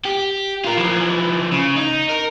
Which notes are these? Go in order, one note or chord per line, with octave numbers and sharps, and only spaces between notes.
G4
F4 A#4
E3 F3
C#3
D#4
A#4